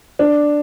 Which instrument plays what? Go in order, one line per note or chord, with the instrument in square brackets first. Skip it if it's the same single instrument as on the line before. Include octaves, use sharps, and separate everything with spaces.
[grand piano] D4